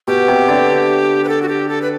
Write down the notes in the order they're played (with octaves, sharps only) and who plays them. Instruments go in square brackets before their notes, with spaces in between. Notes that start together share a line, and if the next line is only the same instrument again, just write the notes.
[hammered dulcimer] B2 [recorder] G4
[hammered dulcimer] C3
D3
[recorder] B4
A4
F#4
G4
A4
B4